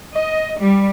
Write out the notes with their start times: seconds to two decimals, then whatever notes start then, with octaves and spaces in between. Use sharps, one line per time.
0.15 D#5
0.59 G3